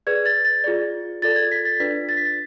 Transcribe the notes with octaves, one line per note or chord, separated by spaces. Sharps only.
G#4 B4 D5 G#6
A6
A6
F4 G#4 D5
F4 A4 D5 A6
G#6
B6
A6
D4 F4 B4 D5 B6
A6
B6
A6